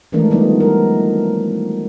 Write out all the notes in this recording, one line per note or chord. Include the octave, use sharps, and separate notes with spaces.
D#3 E3 G#3 A3 D4 A#4
D#3 F3 G3 A3 B3 D#4
A#4